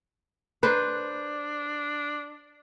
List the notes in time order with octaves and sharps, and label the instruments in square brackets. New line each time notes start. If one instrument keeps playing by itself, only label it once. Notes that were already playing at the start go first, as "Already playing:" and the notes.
[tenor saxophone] D4 [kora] B4 C5